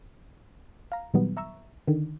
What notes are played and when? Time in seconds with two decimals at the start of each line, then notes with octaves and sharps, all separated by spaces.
0.92 F5 A#5
1.14 A#2 D#3 F#3 G3 B3
1.37 E5 A#5 C#6 E6
1.87 D3 D#3